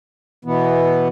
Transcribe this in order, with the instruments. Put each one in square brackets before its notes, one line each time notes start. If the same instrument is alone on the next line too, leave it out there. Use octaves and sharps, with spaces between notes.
[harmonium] B2 E3 B3